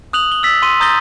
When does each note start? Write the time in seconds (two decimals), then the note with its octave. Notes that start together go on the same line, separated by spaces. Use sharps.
0.13 D#6 F#6 F7 F#7
0.32 G7
0.43 E6 A6 B6
0.62 C6 D#7 G7
0.80 A#5 D#6 G6 A6 A#6 G7